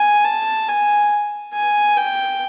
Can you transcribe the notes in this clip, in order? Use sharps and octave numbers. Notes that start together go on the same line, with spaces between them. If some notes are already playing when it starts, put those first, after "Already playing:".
Already playing: G#5
A5
G#5
G#5
G5